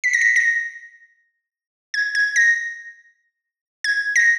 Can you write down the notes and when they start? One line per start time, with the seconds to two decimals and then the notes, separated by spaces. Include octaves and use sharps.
0.04 B6
0.13 A#6
0.21 B6
0.36 A#6
1.94 G#6
2.15 G#6
2.36 A#6
3.84 G#6
4.16 A#6